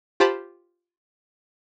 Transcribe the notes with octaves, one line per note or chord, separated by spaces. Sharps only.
F4 G4 C5 A5 B5